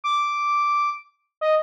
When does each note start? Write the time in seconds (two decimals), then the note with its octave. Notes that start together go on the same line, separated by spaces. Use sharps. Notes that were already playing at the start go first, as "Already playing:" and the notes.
0.04 D6
1.41 D#5